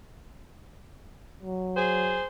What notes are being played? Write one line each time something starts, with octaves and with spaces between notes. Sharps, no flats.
F#3
G#4 C5